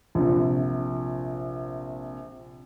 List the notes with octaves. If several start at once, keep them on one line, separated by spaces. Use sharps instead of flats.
A#1 C3